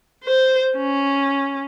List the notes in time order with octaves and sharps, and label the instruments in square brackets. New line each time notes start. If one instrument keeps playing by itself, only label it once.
[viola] C5
C#4